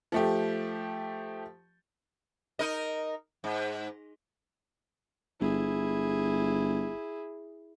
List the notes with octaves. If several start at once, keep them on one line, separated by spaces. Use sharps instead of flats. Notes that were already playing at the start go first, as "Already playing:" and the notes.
F3 A3 G4
D#4 A#4 D#5
G#2
G1 E4 G#4